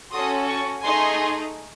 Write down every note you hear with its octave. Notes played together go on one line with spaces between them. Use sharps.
C#4 F#4 A4 C6 D#6
A5 C#6
A3 D#4 G#4 G#5 C6